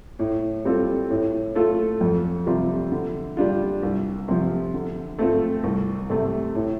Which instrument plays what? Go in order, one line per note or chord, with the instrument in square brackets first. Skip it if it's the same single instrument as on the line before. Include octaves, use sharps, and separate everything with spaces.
[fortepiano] A2
G3 C4 F4 A4
A2
A3 F4 A4
F2
C3 G3 F4
D3
G3 D4 F4
C2
C3 F3
D3
A3 C4 F4 A4
C2
C3 A3
A2